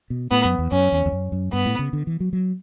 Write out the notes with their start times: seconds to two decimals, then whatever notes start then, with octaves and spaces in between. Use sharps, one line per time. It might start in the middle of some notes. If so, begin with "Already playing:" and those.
0.10 B2
0.31 A2 B3
0.45 F#2
0.59 E2
0.72 F#2 C#4
0.92 E2
1.06 E2
1.12 F#2
1.32 F#2
1.52 G2 B3
1.66 A2
1.79 C#3
1.93 D3
2.07 E3
2.20 F#3
2.33 F#3